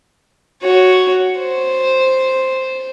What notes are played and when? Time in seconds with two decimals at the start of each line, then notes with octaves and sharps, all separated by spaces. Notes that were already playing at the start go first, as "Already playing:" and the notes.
0.62 F#4 C#5
1.38 C5